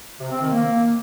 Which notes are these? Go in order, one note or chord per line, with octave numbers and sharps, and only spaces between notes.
C3
C4
D#3
A#3